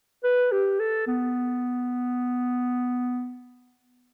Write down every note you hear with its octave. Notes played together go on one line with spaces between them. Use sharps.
B4
G4
A4
B3